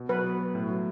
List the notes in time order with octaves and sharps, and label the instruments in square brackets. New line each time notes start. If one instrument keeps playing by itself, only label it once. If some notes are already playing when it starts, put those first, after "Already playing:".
Already playing: [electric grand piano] B2
[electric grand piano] F#3 [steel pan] B4
[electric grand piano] B3
F#4
A2
F#3